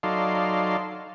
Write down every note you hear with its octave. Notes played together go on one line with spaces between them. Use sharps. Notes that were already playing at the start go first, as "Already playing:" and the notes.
F#3 D#4 A4 D5 F5 C6